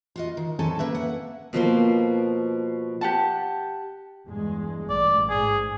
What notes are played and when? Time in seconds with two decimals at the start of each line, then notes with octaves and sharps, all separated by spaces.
0.16 F4 F#4 D#5
0.37 D#3
0.59 A2 C4 C#4 A4 G#5 A5
0.79 A#3 B4 E5
0.95 F#5
1.53 B2 F3 A#3 C6
3.01 G4 F#5 A5
4.27 E2 G2 G#3
4.90 A1 D5
5.30 G#2 G#4